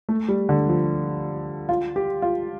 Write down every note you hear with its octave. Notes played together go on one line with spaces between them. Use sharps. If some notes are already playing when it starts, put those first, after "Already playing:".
A3
G3
D3
F3
F4
G4
F4